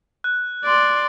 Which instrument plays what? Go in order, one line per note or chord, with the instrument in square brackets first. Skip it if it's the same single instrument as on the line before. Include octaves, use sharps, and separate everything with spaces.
[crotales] F#6
[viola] D5 C6